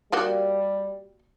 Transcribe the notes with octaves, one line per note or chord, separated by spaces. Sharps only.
G3 A#3 F#4 G4